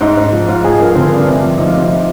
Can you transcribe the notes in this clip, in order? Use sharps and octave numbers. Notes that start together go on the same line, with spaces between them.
G#2 D#4
G#2
F3
G#2 F4
F3 G#4
G2 A#4
D3 C4
G2 D4
C3
F2
F2 D#4
F4
C3 D#4
F3